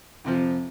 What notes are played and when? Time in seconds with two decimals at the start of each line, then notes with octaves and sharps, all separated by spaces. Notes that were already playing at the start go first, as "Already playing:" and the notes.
0.24 F2 C3 F3